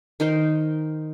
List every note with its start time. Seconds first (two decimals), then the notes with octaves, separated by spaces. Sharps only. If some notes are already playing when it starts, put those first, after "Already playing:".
0.20 D#3 D#4 A#4 C5